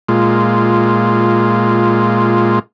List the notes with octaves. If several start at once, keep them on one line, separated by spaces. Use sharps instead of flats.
A#2 G#3 F4